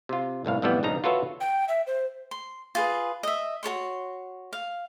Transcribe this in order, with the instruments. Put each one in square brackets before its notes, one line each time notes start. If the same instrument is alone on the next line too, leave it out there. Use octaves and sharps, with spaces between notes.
[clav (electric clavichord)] C3 F4
G1 C2 A2 F5
F2 A2 E3 G3 B3
A#1 G2 C#3 D4 D#4 A#5
F4 F#4 A4 B4 C#5 E5
[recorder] G5
E5
C5
[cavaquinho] C6
F4 G#4 B4
D#5 E5
F#4 A4 C#5 C6
F5